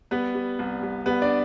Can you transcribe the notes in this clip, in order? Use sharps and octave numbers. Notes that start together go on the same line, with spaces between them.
G3 B3 B4
G3
C2
C2
G3 B3 B4
D4 D5